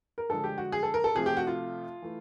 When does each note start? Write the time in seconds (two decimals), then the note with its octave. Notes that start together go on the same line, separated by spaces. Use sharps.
0.18 A#4
0.29 G2 D3 F3 G#3 A4
0.44 G4
0.58 F#4
0.72 G#4
0.83 A4
0.94 A#4
1.04 A4
1.15 C3 F3 A3 G#4
1.26 G4
1.37 F#4
1.47 F4
2.02 E3 A3